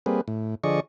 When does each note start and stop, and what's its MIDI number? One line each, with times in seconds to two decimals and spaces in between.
0.06 0.21 55
0.06 0.21 58
0.06 0.21 60
0.06 0.21 68
0.06 0.21 71
0.28 0.55 45
0.64 0.80 50
0.64 0.80 53
0.64 0.80 68
0.64 0.80 74
0.64 0.80 75
0.64 0.80 85